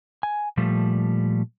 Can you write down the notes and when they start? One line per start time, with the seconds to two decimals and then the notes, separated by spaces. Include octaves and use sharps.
0.23 G#5
0.57 A#2 F3 G3 A3